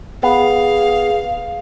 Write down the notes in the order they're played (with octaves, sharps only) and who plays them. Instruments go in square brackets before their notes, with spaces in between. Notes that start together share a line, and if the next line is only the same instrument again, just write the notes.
[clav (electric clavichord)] B3 [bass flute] G#4 [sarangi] F5